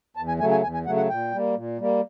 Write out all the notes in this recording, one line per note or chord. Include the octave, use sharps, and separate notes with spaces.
E2 A5
G#5
C#3 F#3 A3 G#5
G#5
E2 G#5
G#5
C#3 F#3 A3 F#5
F#5
A#2 G5
G3 A#3
A#2
G3 A#3